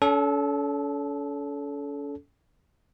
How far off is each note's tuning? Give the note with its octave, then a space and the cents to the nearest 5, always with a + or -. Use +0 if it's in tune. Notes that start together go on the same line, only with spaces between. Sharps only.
C#4 +40 A4 -20